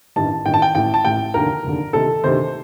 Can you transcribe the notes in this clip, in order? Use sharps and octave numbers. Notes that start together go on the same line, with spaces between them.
A1 G2 D#3 A5
A1 G2 D#3 G5
A5
G5
A1 A2 G5
A5
A1 A2 G5
F1 D#2 D3 A#4
F1 D#2 D3
D2 C3 D#3 A4
D2 C3 D#3 C5